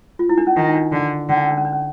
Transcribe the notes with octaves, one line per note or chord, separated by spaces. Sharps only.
F4
E4
D4
C#4
D#3 D4
D#4
D4
D3
D3 C#4
D4
C#4
D4
C#4
D4
C#4